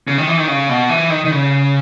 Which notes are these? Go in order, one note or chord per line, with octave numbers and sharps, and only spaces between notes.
C#3
D#3
E3
D#3
C#3
B2
E3
D#3
D#3
C#3